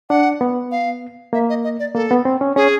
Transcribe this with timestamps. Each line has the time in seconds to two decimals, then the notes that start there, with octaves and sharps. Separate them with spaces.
0.10 D4 F#5
0.41 B3
0.71 F5
1.33 A#3 E5
1.49 D#5
1.64 D#5
1.79 D5
1.95 A#3 A4
2.11 B3
2.25 C4
2.41 C#4
2.56 C#4 G#4